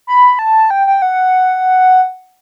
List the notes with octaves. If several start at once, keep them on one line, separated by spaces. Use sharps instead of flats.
B5
A5
G5
G5
F#5